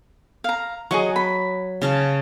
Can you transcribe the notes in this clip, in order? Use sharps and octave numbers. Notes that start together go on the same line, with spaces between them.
F5 A#5
F#3 G#4 D#5 C#6
B5
C#3 F5 A5